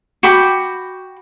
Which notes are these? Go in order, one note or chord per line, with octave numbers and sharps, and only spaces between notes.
F#4 G5 B5 D6